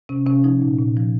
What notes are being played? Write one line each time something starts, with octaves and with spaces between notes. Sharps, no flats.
C3 C#4
C3 C#4
F3 D#4
A#2
A#2
F3